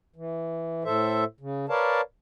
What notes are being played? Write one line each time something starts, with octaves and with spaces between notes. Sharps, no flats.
E3
A2 A4 C5 E5
C#3
A#4 B4 C#5 D5 F5 A5